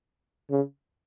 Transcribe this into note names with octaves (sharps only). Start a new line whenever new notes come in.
C#3